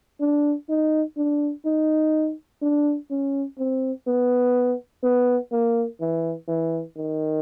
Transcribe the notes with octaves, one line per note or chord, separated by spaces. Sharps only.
D4
D#4
D4
D#4
D4
C#4
C4
B3
B3
A#3
E3
E3
D#3